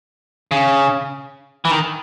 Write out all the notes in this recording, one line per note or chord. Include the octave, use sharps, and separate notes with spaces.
C#3
E3
D#3